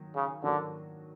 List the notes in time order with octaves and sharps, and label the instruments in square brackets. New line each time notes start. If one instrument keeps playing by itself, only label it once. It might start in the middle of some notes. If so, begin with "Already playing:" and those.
Already playing: [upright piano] D#3 F#3 A#3
[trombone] C#3
[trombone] D3 [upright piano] D#3 F#3 A#3 D4 F#4